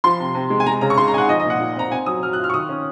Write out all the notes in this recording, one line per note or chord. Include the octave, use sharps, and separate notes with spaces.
F3 C6
C3
C3
G#3
G#5
G#3 A#5
C#3 A#5
C#6
C#3 C6
A#5
D#4 G#5
F#5
F3 D#5
D#5
A#2
F#5
A#2
C4 A#5
C4 G#5
F#3 D#6
F#3 F6
F#6
F4
F6
C#6
D#3 D#6
C#4